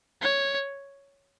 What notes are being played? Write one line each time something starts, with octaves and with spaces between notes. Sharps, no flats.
C#5